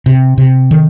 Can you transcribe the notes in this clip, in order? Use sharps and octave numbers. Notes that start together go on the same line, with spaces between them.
C3
C3
D#3